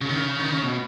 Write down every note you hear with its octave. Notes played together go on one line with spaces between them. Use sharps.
C#3
D#3
C#3
D#3
C#3
B2